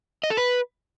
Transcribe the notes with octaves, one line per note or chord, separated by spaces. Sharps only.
D#5
A4
B4